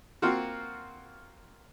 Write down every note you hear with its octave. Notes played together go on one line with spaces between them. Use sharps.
A#3 C4 F4 F#4